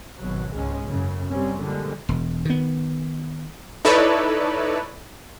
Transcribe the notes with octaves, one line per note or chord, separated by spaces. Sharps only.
G#1 B2 F#3
C#2 G#2 G#3 C#4
F#1 F#2 C#3
C3 G3 C4 C#4
A#2 D3 F3 G3 G#3
E1
D#3 B3
D#4 E4 A4 B4 C#5 D5